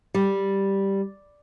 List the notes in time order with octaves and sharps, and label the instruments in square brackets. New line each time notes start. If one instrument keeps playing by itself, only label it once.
[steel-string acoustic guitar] G3